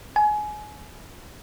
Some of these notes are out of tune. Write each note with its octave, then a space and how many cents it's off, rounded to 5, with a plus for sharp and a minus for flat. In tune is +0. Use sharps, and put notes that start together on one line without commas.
G#5 +25